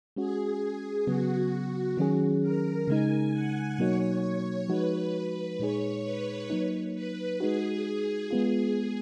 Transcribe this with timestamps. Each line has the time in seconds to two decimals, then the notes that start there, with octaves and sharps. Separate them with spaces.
0.16 G#3 C#4 F#4 G#4
1.07 C#3 F#3 B3 F#4
1.53 F#4
1.97 D#3 F#3 C#4 G#4
2.42 A#4
2.87 C#3 G#3 D#4 G#5
3.33 F#5
3.78 B2 F#3 A#3 D#4 F#4 C#5
4.23 C#5
4.69 F3 G#3 D#4 F#4 B4
5.59 A#2 G#3 D#4 G#4 C#5
6.04 B4
6.50 F#3 A#3 D#4
6.95 B4
7.40 G#3 D#4 F#4 G#4
8.30 G#3 B3 F4 G#4